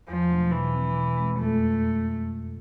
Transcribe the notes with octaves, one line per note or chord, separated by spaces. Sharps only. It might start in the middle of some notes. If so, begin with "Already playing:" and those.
E2 F3
B2 F#3 A3 D4
B2 E3
G#3 C4
B2
G#3 C4
F2 A3